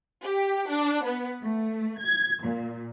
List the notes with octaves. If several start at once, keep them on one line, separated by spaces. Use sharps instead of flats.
G4
D4
B3
A3
G#6
A#2